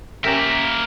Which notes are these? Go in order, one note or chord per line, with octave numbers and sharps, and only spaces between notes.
A#3 C#4 G4 A#4 E5